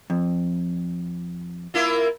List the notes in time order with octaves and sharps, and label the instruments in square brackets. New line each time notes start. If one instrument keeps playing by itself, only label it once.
[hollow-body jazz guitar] F2
[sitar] A#3 E4 F4